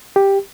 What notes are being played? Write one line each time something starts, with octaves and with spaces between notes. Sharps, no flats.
G4